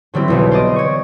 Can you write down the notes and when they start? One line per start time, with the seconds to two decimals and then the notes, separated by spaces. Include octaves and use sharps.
0.14 D3 F#3 G3 C4 E4
0.28 E1 B1 E2
0.51 C5 D5 D#5
0.76 C#5 C#6